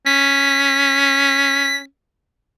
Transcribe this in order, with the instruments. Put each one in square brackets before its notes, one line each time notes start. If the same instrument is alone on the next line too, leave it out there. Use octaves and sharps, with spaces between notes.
[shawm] C#4 [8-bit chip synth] B6